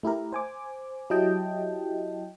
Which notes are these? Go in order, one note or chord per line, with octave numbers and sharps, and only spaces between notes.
A3 E4 G4 A#4
C5 G#5 D6
F#3 E4 G4 D#5 G5 A5